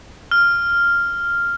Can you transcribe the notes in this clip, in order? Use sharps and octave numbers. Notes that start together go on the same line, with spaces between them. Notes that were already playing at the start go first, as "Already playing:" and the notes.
F6